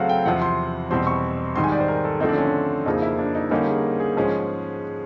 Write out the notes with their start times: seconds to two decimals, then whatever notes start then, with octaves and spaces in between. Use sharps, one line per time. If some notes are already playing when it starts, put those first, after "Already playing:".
Already playing: C#3 F#3 A3 C4 F5 F#5
0.09 G5
0.25 E2 C3 F3 F#5
0.42 C6
0.91 E2 B2 G3 C4 C6
1.07 C#6
1.56 G#2 D#3 G3 C6
1.64 G#5
1.72 D5
1.80 C5
1.88 A#4
2.04 A4
2.20 D3 F3 A3 C4 D#4
2.29 D4
2.37 C#4
2.45 D4
2.85 F2 C#3 F3 A#3 D#4
3.02 E4
3.19 D4
3.35 D#4
3.51 D3 G3 A#3 C#4 D#4
3.67 G#4
4.00 G#4
4.16 G#2 F3 G#3 C#4